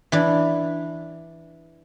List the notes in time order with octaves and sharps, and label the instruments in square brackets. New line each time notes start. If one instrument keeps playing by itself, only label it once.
[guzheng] E3 D4